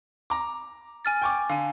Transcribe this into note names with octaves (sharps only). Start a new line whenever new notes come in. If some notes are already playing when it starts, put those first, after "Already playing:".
A#5 D6
G#5 F6 A6
G5 C#6 D6
D3 F5 G#5